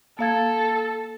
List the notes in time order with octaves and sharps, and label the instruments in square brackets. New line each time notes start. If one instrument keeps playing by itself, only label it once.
[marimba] A#3 F5 G#6 [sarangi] A4